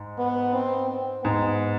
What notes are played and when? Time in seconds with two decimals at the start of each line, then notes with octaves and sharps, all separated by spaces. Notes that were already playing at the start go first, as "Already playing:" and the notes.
Already playing: G#2
0.18 B3
0.53 C4
0.89 C4
1.24 G#2 B3